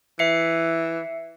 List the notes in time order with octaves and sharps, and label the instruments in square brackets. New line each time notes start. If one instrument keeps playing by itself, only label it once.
[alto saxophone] E3 [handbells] E5 C7 C#7